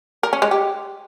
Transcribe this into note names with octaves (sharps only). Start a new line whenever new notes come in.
A#4
C#4
G#3
G4